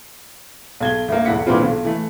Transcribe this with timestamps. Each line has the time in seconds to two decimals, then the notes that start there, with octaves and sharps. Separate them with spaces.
0.80 B1 G#6 G7
1.08 D2 A#3
1.25 B1 E2 E4 F#5 B6 C#7
1.46 A#2 D3 E3 B3 C4 F4
1.61 B1
1.85 E3 A3